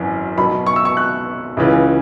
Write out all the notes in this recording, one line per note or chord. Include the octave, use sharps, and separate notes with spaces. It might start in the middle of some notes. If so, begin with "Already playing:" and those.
Already playing: G#1 F#2 E3
B1 B2 B5
C#6
E6
C#6
F#6
C#2 C#3 E3